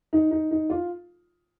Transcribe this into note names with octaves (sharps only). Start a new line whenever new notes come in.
D#4
D#4
D#4
F4